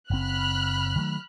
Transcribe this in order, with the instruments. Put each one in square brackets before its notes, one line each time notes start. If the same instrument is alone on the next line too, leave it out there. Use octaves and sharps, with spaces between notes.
[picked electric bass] F#1 C4 [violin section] B5 F6 F#6
[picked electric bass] D#3 F#3 A3